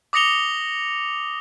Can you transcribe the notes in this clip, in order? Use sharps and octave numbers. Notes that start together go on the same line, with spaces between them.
D6 D#6 A#6 C#7 F7 G7